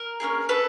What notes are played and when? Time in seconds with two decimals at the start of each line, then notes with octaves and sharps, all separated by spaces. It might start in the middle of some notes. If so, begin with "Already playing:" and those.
Already playing: A#4
0.20 A#3 C#4 E4 G#4
0.49 A4 B4